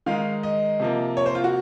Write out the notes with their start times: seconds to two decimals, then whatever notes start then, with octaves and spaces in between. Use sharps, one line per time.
0.06 D#3 G#3 D#4 F5
0.43 D#5
0.80 C3 F3 A#3
1.17 C#5
1.26 C5
1.35 F4
1.44 F#4